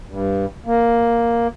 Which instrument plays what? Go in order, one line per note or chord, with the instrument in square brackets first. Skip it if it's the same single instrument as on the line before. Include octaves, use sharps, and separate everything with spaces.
[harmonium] G2
A#3